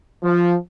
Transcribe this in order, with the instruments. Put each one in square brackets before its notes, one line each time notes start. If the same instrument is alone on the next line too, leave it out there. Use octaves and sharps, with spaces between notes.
[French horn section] F3